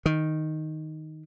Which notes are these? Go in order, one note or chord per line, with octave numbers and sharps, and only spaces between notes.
D#3